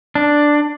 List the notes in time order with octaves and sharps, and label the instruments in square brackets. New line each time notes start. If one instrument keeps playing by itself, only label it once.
[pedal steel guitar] D4